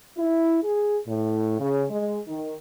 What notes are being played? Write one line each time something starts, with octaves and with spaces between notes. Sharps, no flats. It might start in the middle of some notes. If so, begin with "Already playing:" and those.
E4
G#4
A2
C#3
G#3
D#3